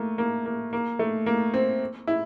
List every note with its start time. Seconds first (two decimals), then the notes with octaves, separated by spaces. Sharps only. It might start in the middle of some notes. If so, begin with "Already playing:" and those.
Already playing: A3 A#3
0.18 A#3
0.46 A#3
0.73 A#3
0.99 A3
1.26 A#3
1.54 C4
2.07 E4